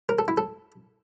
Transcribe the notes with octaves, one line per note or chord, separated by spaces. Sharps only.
A#4
A4
E4
A4